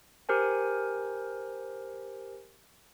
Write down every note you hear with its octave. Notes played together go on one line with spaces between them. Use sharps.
G4 A#4 C5 G#5